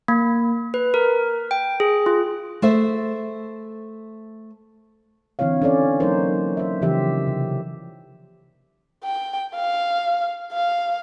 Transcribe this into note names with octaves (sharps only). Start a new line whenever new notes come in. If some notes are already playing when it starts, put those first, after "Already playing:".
A#3
B4
A#4
G5
G#4
F4
A3 C5 E5
D3 E3 C4 E4 C#5 F5
C#4 A4 C#5 D5
F#3 A#3 C#4 D#4 A#4 C5
C5 E5
C#3 E3 F3 G4 E5
C3
G5
F5
F5